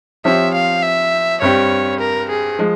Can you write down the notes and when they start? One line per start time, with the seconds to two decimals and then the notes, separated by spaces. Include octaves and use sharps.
0.25 F3 C4 G4 C#5 E5
0.54 F5
0.83 E5
1.41 G2 G3 C4 G4 C#5
2.00 A#4
2.30 G#4
2.59 F3 G#3